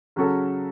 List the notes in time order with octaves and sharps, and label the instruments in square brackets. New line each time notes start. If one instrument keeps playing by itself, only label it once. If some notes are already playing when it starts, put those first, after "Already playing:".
[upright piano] C#3 F#3 C#4 F#4 A4